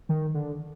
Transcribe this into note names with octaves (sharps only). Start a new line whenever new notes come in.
D#3
D3